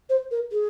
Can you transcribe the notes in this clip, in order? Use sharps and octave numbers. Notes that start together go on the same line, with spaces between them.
C5
A#4
G#4